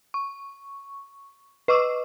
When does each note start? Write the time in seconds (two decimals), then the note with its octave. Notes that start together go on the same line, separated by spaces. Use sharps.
0.14 C#6
1.68 B4 D#5 C#6 D6 E6